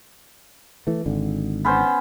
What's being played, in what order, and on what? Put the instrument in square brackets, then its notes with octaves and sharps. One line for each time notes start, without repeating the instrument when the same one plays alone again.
[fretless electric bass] E3 A3
G#1 D3
[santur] B3 C#4 C5